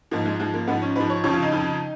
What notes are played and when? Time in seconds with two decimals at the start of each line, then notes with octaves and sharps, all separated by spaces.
0.11 G#2 F3 A#3
0.25 G#3
0.40 G#2 F3 G#3
0.54 A#3
0.68 G#2 F3 B3
0.82 C#4
0.96 G#2 F3 B4
1.10 C#5
1.24 F2 C#3 F3 C#5
1.33 F4
1.42 D#4
1.52 F2 C#3 F3